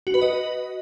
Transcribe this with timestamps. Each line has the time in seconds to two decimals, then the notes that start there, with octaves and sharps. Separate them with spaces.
0.07 F#4
0.14 B4
0.21 D#5